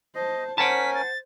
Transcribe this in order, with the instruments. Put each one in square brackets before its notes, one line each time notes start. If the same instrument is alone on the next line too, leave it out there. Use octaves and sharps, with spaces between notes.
[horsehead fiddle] C5 A5 [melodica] D#5
[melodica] C#4 A#4 G#5 [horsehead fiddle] C5 [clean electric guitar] F#5 A5 [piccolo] B6
[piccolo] A6